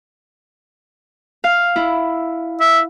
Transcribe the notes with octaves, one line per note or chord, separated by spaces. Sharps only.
F5
E4
E5